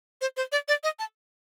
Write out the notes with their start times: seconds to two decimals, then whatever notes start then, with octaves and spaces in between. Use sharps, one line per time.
0.21 C5
0.37 C5
0.52 D5
0.68 D5
0.84 D#5
0.99 A5